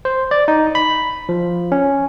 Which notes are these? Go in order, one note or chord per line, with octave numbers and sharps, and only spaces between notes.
C5
D5
D#4
B5
F3
C#4